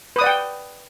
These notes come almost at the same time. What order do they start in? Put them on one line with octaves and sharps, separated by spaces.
B4 D#6 D5 F#5 G5